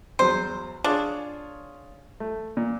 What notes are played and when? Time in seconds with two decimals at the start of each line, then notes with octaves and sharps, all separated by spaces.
0.19 E2 F#3 B3 C5
0.84 D4 F4 G#4 C#5
2.20 A3
2.57 A#2